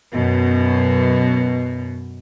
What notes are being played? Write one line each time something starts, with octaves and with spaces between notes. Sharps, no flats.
F#2 B2